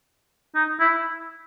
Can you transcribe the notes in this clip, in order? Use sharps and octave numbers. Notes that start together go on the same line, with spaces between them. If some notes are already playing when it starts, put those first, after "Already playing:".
D#4
E4